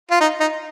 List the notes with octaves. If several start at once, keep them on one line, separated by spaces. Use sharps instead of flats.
F4
D#4
D#4